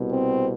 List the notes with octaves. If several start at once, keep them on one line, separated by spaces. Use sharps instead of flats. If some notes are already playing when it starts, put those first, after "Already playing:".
Already playing: C2 B2
C4